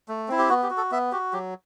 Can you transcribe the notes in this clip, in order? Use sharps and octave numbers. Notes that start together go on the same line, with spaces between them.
A3
C4 E4
G4
B3 F#4
G4
F#4
A4
B3 E5
F#4 G4
F#3 G4